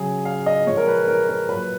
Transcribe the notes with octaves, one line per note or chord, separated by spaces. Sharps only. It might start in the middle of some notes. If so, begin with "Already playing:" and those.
Already playing: C#3 F#3 G#4
F5
D#5
A#2 F3 G#3 C#5
A#4
B4
A#4
A#4
A#2 F#3 B4